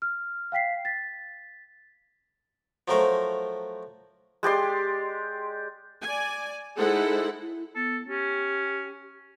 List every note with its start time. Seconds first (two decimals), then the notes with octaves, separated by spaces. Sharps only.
0.02 F6
0.52 F5 G5 B6 C7
0.85 A6 B6
2.88 F3 F#3 A3 A#4 C5
4.43 G#3 G4 D5 C6
6.02 D5 G#5
6.77 G#3 D#4 E4 A4 C5 F#5
7.41 E4
7.75 B3 A4
8.08 C#4 G4